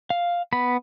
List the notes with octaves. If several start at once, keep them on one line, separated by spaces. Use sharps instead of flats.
F5
B3 B5